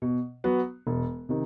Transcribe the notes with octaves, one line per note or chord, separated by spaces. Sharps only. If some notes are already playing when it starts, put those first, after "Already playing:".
B2
F#3 B3 F#4
E1
C3 D#3